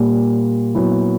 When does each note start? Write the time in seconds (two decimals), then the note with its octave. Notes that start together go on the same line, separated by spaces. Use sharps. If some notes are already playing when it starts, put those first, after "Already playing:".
Already playing: A#2 G3 A#3
0.75 A#2 F#3 B3 E4